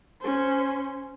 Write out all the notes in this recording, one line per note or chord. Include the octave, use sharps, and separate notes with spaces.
C#4 C5